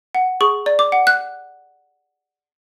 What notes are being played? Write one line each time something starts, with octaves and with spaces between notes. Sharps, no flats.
F#5
G#4 C#6
D5
D6
F#5
F#6